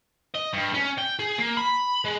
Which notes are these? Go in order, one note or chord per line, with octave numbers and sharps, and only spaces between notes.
D#5
G2
C#4
G5
G#4
A#3
B5
G#3